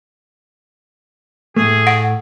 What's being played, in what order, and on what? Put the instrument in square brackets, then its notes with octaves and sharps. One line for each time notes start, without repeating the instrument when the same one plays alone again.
[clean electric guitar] A2 A3 [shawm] G#4
[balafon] F#5